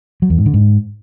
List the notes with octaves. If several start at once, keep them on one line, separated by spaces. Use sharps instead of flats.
F#3
E2
G#2
D3
G#2